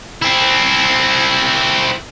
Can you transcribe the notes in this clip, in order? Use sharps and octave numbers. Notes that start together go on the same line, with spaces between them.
C4 E4